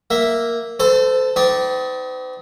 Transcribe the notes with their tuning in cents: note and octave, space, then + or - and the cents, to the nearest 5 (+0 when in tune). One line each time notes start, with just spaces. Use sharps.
A#3 +0 E5 +0
A4 +0 C5 -30 A5 +30
C4 -40 D#4 +30 D5 +0